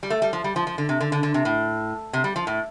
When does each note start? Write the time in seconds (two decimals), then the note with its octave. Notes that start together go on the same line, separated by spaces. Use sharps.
0.03 G3
0.10 A3
0.22 G3
0.33 F3
0.44 G3
0.56 F3
0.67 F3
0.78 D3
0.89 C3
1.00 D3
1.12 D3
1.23 D3
1.34 C3
1.45 A2
2.13 C3
2.24 G3
2.36 F3
2.47 A2